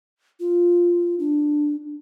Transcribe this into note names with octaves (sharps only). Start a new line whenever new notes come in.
F4
D4